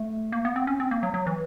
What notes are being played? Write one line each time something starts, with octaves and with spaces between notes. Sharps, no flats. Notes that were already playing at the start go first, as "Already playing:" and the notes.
Already playing: A3
A#3
B3
C4
C#4
C4
A#3
F#3
F#3
E3